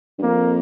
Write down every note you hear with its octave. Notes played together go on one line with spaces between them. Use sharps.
G2
F2 A#3